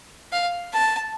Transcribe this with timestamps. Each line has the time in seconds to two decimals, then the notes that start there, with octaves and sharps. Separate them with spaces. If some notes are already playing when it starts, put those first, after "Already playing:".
0.32 F5
0.73 A5